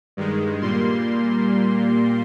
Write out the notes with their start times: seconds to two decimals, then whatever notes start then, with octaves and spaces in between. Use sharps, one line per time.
0.17 G2 D#3 G#3
0.62 A#2 G3 A#3 C6